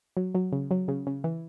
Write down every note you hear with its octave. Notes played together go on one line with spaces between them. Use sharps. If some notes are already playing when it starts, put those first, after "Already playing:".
F#3
F#3
C#3
F#3
C#3
C#3
E3